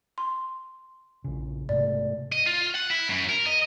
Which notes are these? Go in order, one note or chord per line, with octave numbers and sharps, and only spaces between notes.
C6
A#1 C#3
G#2 C3 A3 D5
D#5
F4
F#5
E4
F#2
A#4
D#5